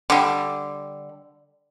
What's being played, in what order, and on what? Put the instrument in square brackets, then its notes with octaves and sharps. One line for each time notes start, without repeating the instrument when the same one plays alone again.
[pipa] D3 G3